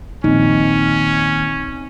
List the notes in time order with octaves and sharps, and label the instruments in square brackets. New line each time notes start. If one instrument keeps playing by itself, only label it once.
[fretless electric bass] A#1 [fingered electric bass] D#2 [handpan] C4 D#4 [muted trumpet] C#4